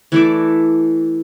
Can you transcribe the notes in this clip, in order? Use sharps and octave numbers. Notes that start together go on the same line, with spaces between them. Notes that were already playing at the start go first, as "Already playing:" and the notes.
E3 A3 D5